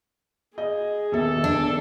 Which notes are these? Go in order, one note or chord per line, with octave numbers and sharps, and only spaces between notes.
G#4 D#5
D#1 B1 A4 E5
D4